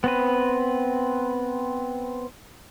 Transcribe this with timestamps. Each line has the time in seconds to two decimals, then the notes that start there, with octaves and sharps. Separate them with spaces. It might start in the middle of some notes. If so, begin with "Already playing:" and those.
0.04 B3 C4 B4